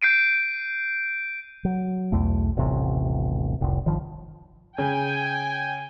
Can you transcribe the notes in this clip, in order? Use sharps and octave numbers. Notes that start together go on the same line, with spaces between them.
G6 C7 D7 D#7
F#3
B1 E2 A3
D#1 A1 C3
F1 C2
G1 D#3 F3
C#3 G5 G#5